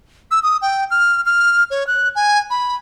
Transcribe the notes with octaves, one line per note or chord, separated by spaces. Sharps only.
E6
D#6
G5
F6
F6
C#5
F#6
G#5
B5